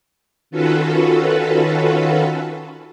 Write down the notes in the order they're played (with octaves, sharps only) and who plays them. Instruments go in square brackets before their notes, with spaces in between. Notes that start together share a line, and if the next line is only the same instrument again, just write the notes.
[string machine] D#3 C#4 F4 F#4 A4 B4